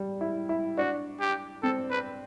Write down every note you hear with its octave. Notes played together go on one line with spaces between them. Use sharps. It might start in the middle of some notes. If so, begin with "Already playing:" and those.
Already playing: G3
E4
E4
D4 F#4
G4
C4 A4
B4